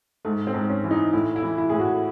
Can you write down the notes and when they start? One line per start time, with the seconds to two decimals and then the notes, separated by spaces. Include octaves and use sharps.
0.25 G#2 A3
0.47 C4
0.54 G#2
0.69 C#4
0.84 E3
0.91 D#4
1.13 A2 E4
1.36 E4
1.43 E3
1.58 E4
1.70 A2 G#4
1.79 F#4